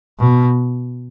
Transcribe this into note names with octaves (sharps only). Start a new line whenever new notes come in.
B2